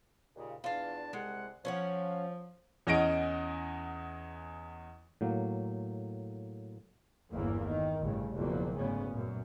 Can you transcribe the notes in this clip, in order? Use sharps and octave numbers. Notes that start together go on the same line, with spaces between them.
D#2 A#2 C#3
E2 D4 F4 F5 A5
C2 G#3 F#5
F3 C#4 C#5 F#5
E2 C#4 D#5 F#5 D7
A2 F#3 A#3
G1 E2 E3 A#3
D#3
A1 G2 C#3
F#1 E2 B2 F3 F#3 A#3
D2 G#2 C#3 B3 C#4
F#2 A#2